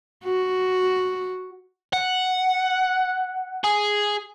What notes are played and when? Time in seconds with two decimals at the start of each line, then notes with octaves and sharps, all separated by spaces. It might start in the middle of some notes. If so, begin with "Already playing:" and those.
0.24 F#4
1.93 F#5
3.64 G#4